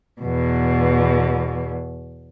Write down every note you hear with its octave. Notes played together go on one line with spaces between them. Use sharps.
E2 B2